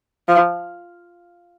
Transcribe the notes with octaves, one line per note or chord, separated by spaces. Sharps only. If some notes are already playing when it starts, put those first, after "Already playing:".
F3